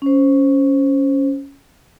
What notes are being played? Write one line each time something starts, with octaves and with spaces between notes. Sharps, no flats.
C#4 C5